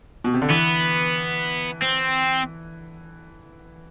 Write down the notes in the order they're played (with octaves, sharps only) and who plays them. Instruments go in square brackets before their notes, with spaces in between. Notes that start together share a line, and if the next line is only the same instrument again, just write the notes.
[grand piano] B2
C3
D3
[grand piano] E3 [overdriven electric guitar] B3
[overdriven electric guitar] C4